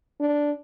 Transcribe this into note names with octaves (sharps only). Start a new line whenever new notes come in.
D4